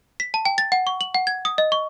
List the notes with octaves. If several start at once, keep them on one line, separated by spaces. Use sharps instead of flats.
B6
A5
G5
A6
F#5
C#6
F#7
F#5
G#6
D#6
D#5
C#6